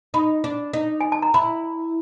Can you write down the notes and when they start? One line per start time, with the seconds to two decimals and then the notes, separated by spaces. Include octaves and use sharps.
0.14 D#4 B5
0.44 D4
0.73 D#4
1.01 G#5
1.12 A5
1.22 A#5
1.34 E4 B5